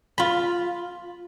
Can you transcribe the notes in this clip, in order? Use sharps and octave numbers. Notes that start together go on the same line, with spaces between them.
F4 B5